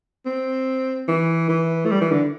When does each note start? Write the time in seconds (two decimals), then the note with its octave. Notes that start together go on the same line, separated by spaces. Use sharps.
0.26 C4
1.08 E3
1.49 E3
1.85 A3
1.91 G3
2.01 E3
2.12 D3